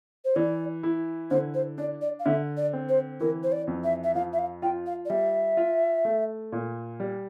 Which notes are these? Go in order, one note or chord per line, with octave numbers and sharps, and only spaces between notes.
C5
E3 D5
E4
D3 C5
C5
D4 D5
D5
F5
D3 E5
D5
C4
C5
E3 A#4
C5
D5
F2
E5
E5
F3 F5
E5
F5
F4 G5
F5
D5
G3 E5
F4
A3
A#2
G3